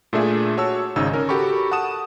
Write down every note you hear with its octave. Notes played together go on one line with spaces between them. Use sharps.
A#2 A3 D4 G#4 E5
F#4 C#5 A5 E6
G#1 C#3 D#4 E6
C#4 A#4
F#4 G4 A4 A#4 B5 C#6
F#5 A5 D#6 E7